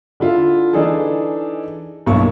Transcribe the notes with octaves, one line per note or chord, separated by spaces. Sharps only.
D3 E4 F4
E3 D4 D#4 G#4 A4
B1 G2 A#3 E4 C#6